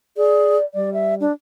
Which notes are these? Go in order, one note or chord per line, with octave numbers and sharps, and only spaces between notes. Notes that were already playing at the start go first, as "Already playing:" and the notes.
G#4 D5
G3 D5
E5
D4